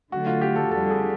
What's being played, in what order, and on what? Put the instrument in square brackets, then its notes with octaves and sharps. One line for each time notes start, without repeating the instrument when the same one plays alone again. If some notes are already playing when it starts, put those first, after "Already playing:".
[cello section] D3 F#3 A3 [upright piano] F#4
[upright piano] F4
G4
A4
[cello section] F2 D3 G3 [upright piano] A4
[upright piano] G#4